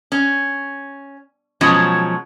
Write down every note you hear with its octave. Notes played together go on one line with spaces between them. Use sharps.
C#4
B2 F3 F#3 G#3 C#4